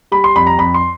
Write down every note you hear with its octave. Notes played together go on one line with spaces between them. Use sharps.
G3 B5
C6
F2 B5
A#5
F2 B5
C6